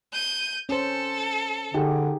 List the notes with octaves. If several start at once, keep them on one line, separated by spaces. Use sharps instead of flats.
G6 D#7
C#4 A4 C5
D3 D#4 G4 G#4